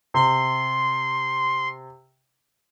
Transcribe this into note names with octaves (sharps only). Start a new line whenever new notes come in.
C3 C6